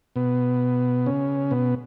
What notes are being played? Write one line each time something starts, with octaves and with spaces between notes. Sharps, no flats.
B2 B3
C#3 C#4
B2 B3